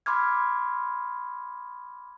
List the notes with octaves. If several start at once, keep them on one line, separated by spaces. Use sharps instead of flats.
B5 C6 D6 F6 G#6